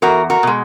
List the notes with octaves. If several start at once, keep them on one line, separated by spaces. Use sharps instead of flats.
E2 F#4 A#4
F#4 A#4
B2 G#3